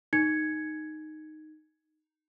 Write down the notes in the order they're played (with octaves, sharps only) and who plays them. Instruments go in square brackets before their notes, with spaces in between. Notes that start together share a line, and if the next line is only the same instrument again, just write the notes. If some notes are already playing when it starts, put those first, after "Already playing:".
[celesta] D#4 G#6 C#7